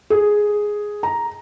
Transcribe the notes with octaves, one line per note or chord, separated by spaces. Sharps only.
G#4
A#5